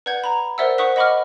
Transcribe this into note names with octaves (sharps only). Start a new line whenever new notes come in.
B4 D5 F#5 G6 G#6
A#5 B5
A#4 C5 D5 E5 F#5 E6
C5 F#5 C#6 D#6 F#6 B6
D#5 F#5 B5 C#6 D6 F6